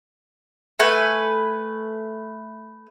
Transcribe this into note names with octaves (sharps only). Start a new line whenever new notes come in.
A3 B4 G#5